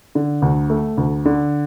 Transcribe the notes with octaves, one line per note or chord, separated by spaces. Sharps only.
D3
D2
A3
D2
D3